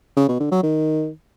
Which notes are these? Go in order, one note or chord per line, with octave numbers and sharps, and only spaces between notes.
C#3
B2
D3
F#3
D#3